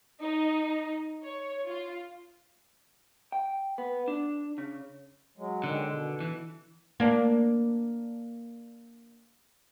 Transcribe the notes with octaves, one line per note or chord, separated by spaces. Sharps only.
D#4
C#5
F4
G5
B3
D4
C#3
F#3 G#3
D3 D#3 G#3
B2
E3
A#3 D4